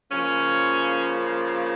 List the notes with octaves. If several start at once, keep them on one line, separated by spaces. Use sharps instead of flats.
C#3 F3 A#3 C#4